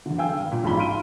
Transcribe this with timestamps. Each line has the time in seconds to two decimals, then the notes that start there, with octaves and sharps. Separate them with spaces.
0.06 E2 D3
0.18 F5 G5 G#5 E6
0.39 G2
0.52 A#2
0.64 A1 G#2 F4 A5 B5 G7
0.77 F5 B5 C6 F6 D7 D#7